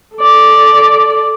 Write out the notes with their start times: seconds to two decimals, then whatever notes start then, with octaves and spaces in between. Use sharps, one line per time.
0.17 A4 D5